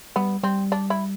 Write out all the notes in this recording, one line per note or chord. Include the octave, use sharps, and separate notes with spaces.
G3 B3
G3 C4
D4
E4